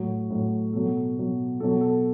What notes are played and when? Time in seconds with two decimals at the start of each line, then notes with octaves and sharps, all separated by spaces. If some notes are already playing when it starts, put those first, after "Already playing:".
Already playing: A2 F#3
0.30 A2 F#3
0.73 B2 F#3 A4
1.17 B2 F#3
1.60 B2 F#3 A4
1.81 A4